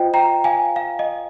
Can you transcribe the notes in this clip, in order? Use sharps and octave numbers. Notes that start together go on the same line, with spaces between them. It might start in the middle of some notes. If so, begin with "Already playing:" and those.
Already playing: F4 C5 D#5 G5
G5 A#5
F5 G#5
F5
D#5